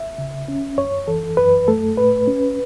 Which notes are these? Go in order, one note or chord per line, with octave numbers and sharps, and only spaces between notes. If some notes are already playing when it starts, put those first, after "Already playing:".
Already playing: E5
C#3
C#4
F#2 C#5
E3 A4
F#2 B4
A3 A4
A2 B4
C#4